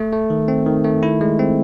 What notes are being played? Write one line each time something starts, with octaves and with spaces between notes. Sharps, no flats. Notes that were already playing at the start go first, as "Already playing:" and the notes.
Already playing: A3
A3
D#3
C4
D#3
A3
E4
G#3
C4